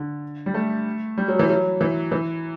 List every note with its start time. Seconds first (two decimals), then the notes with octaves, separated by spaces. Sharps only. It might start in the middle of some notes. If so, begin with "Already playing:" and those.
Already playing: D3
0.46 G3
0.54 A3
1.17 G3
1.28 F#3
1.39 E3
1.50 F#3
1.81 E3
2.12 E3